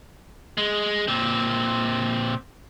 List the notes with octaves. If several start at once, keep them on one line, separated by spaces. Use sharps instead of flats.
G#3
A#2 C4